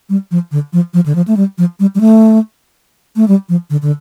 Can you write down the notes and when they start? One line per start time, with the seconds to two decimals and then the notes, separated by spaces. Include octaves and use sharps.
0.09 G3
0.31 F3
0.52 D3
0.73 F3
0.94 F3
1.06 D3
1.15 F3
1.27 A3
1.37 G3
1.58 F3
1.80 G3
1.95 G3
2.01 A3
3.16 A3
3.28 G3
3.49 F3
3.70 D3
3.82 D3